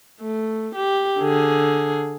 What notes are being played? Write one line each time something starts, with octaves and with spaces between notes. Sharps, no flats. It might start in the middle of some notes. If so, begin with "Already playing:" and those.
A3
G4
D3 G#4